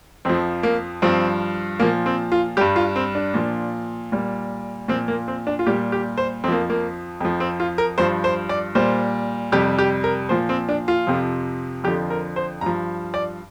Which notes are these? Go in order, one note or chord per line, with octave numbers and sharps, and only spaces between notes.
F2 F3 C4
A#3
G2 F3 C4
A#2 F3 A#3
C4
F4
G2 G3 G4
F4
C4
D4
A#2 F3
A#2 G3
A#2 F3 C4
A#3
C4
D4
F4
A#2 G3 G4
G4
C5
F2 F3 A#3 C4
A#3
F2 F3
C4
F4
A#4
G2 F3 C5
C5
D5
A#2 G3 C5
F2 C3 G3 G4
G4
A#4
A#2 F3 C5
C4
D4
F4
F2 C3 F3
F2 D3 F3 G4
A#4
C5
G2 F3 A#5
D5